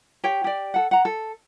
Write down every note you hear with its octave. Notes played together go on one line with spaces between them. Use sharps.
G4 C#5 G5
G4 D5
A4 F#5
F#5 A#5
A4